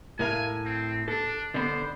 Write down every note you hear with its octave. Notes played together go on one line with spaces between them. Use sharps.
A2 A#4 F5 G#5
C4
D4 A4
D3 B3 C5